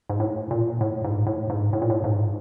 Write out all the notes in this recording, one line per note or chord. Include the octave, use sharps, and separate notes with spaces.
G#2
A2
A#2
A2
G#2
A2
G#2
A2
A#2
A2
G#2